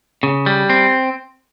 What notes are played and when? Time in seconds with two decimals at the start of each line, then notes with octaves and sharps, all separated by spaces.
0.23 C#3
0.46 G3
0.70 C4